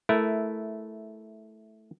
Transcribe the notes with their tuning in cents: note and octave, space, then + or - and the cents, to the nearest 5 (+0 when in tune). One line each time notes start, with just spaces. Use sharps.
A3 -10 E4 +0 A#4 +0